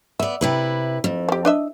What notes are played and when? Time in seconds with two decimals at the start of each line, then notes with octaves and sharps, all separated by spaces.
0.19 B3 D5 E5
0.41 C3 E4 B4
1.04 F2
1.29 F3 G4
1.45 D4 D#5 E5